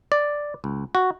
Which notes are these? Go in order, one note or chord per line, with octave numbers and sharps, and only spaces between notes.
D5
C#2
F#4